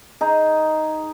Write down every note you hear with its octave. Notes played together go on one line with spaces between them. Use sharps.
D#4 G#4